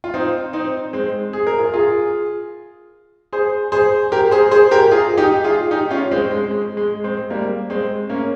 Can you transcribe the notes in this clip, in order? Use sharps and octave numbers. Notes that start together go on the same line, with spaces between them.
F4
C4 D#4
C4 D#4
G#3 C4
G#4
A#4
F4 G#4
F4 G#4
G#4 C5
G#4 C5
G4 A#4
G#4 C5
G#4 C5
G4 A#4
F4 G#4
D#4 G4
F4 G#4
D#4 G4
C#4 F4
G#3 C4
G#3
G#3
G#3
G#3 C4
G3 A#3
G#3 C4
A#3 C#4